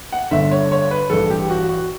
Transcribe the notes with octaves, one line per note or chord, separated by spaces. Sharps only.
F#5
G1 G2 D3 E5
C#5
C#5
B4
A1 G2 E3 A4
G4
F#4
F#4